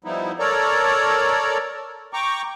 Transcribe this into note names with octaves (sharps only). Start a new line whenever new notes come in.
F3 G3 B3 D#4 E4
A4 A#4 C#5 D5 A#5
G5 A#5 C#6 D6